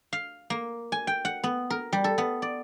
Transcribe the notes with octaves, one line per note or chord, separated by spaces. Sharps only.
F5
A#3
G#5
G5
F#5
B3
A#4
G3
A4
B3
D5